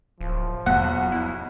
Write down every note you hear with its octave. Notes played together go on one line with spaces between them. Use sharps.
D1 F3
B1 E2 F#5
E4